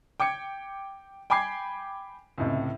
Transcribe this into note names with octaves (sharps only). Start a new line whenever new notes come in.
G5 D6 G#6 C#7
G5 G#5 B5 D6 G#6 C7
C#2 A2 C3